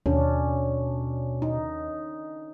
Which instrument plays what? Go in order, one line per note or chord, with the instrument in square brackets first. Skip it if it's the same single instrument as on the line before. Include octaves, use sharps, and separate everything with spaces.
[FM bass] D#2 [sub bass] B2 [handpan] C#4 D4
[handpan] D#4